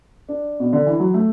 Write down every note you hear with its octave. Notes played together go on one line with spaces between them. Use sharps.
D4
B2
D3
E3
F#3
A3